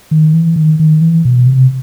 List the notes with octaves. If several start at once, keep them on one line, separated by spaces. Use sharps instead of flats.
D#3
E3
D#3
D#3
E3
B2
C3